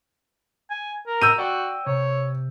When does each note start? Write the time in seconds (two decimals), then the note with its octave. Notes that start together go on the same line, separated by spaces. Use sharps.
0.70 G#5
1.07 A#4
1.21 E6 G6 D#7
1.38 F#4 D5 F#5 G5
1.86 C3 C#5